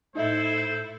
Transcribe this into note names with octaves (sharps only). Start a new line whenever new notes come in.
A2 D#4 E4 A4 C5 D#5 E5
G6 C7